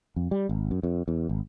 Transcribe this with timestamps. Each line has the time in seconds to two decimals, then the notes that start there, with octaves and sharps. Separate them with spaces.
0.16 F2
0.31 G3
0.49 G#1
0.71 F#2
0.83 F2
1.08 E2
1.29 G#1